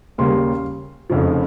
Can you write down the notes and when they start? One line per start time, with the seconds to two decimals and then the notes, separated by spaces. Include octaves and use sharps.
0.18 D#2 C#3 G3 A#3 C6
1.10 F1 F2 C#3 F3